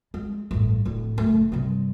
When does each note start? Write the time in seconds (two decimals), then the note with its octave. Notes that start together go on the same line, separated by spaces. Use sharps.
0.14 G#3
0.51 A1 G2
0.85 D1 A2
1.18 F#1 A3
1.52 G2 C3